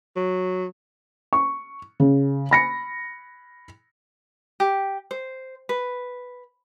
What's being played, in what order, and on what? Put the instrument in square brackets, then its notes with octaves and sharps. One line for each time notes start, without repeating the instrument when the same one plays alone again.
[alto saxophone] F#3
[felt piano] C#6
C#3
B5 A#6 C#7
[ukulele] G4
C5
B4